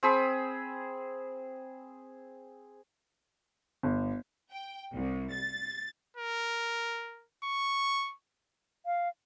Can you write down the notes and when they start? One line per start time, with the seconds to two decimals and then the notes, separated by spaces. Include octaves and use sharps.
0.03 C4 G#4 B5
3.83 G1
4.51 G5
4.93 C2
5.32 A6
6.17 A#4
7.44 C#6
8.86 F5